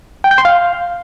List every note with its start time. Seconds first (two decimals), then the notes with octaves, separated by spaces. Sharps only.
0.24 G5
0.31 G6
0.38 C6
0.45 F5